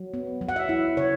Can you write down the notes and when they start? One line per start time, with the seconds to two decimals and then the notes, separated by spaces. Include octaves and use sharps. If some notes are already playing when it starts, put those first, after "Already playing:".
Already playing: F#3
0.14 B3
0.41 F#3
0.49 F#5
0.56 E5
0.69 E4
0.97 C#3 C#5